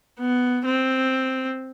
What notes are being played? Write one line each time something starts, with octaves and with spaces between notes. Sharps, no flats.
B3
C4